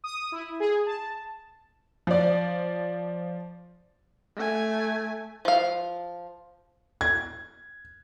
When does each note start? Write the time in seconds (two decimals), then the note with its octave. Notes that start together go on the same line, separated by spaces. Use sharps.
0.04 D#6
0.32 E4
0.60 G#4
0.86 A5
2.07 F3 D5
4.36 A3 G#5
5.45 F3 F5
7.01 G#6